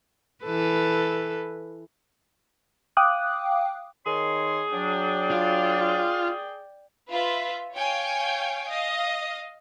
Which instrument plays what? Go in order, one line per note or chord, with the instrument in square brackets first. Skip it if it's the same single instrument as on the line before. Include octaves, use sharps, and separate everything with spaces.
[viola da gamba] E3 A4 B4
[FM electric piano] F5 G5 D6 D#6 F#6
[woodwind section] D#3 C#5 C6 [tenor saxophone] G#4
[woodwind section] F#3 D4 [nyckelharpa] D5 G5
[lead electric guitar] F4
[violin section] F4 B4 E5
C#5 F5 G5 G#5
D#5 F5